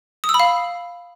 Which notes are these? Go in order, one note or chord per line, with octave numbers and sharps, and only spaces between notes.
D#6
E6
B5
F5